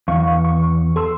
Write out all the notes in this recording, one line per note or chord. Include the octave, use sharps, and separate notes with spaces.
E2 F5 C#6
C#6
A4 C6 E6